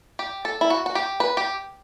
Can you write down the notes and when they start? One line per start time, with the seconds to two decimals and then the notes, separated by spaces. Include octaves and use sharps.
0.19 G4
0.45 A4
0.61 E4
0.70 F#4
0.86 F#4
0.95 G4
1.20 B4
1.37 G4